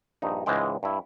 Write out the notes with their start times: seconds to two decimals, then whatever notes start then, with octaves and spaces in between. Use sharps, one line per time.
0.22 A#1 G2 D#4
0.46 C#2 G#2 E3 G#3 G5
0.83 G2 E4